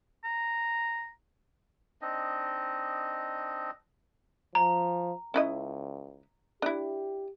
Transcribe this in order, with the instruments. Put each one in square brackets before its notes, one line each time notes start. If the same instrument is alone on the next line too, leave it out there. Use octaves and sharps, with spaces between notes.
[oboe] A#5
[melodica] C4 D4 D#4 D#5
[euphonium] F3 [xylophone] A#5
[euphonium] C#2 [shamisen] C#4 E4 D#5
[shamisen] D4 E4 [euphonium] G4